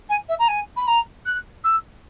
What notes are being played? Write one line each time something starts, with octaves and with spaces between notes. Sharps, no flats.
G#5
E5
A#5
G#5
B5
A#5
F#6
E6